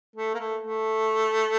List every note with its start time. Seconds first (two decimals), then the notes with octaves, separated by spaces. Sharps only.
0.16 A3
0.34 A#3
0.40 A3
0.63 A3